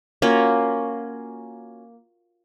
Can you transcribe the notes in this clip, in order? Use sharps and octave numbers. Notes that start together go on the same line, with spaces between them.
A#3 C#4 F4 F#4